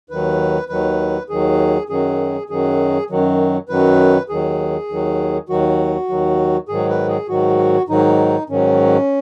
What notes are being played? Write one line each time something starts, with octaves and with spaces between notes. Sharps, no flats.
D#2 D#3 F#3 B4
D#2 D#3 F#3 B4
D#2 D#3 F#3 G#4
F#2 D#3 F#3 G#4
F#2 D#3 F#3 G#4
F#2 D#3 F#3
F#2 D#3 F#3 B4
D#2 D#3 F#3 G#4
D#2 D#3 F#3
D#2 D#3 F#3 F#4
D#2 D#3 F#3
G#2 D#3 F#3 G#4
B4
G#4
G#2 D#3 F#3 F#4
G#2 D#3 F#3 D#4
G#2 D#3 F#3 C#4